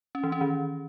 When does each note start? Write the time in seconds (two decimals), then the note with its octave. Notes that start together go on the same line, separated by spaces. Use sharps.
0.15 C#4
0.23 E3
0.32 C#4
0.41 D#3